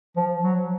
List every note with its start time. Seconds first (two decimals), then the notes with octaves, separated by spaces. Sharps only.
0.16 F3
0.43 F#3